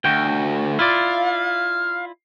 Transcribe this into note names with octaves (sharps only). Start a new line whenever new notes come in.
D2 F#4 G5
E4 F4 D5 F5